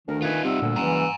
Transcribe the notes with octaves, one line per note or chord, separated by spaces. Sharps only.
D2 D#3 D4 A#4
D#4 F4 B4 G#5
C3 G3 F#5 E6
D2 A#2 D3
F#1 E3 G#5 A#5